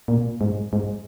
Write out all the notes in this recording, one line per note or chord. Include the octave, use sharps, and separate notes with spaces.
A#2
G#2
G#2